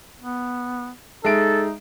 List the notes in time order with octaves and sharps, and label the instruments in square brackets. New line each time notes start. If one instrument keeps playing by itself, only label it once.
[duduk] B3
[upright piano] G#3 E5 D7 [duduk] D#4 [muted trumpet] A4